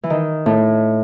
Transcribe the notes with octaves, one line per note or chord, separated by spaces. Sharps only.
E3
D#3
A2